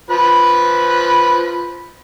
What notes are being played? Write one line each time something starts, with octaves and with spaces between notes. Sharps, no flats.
F3 B4 B5